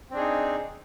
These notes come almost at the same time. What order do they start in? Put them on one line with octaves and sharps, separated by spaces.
C4 D4 G#4 D#4